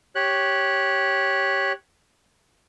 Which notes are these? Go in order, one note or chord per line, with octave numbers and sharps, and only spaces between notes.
G4 C#5 F#6